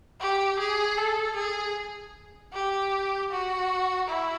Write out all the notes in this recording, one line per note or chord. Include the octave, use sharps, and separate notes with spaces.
G4
G#4
A4
G#4
G4
F#4
E4